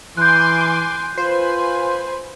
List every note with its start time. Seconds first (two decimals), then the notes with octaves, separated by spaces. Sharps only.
0.17 E3 G#5 C6 D6 F#6 G6
1.17 F4 B4 C5 G#5